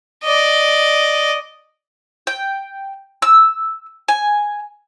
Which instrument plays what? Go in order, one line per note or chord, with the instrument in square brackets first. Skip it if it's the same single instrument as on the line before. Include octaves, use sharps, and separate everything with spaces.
[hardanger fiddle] D5 D#5
[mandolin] G5
E6
G#5